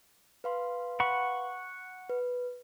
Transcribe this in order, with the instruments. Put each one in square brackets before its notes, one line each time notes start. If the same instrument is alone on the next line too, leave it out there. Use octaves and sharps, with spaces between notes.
[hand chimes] B4 F5 C6
[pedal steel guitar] F#5 B5 C#6
[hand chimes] B4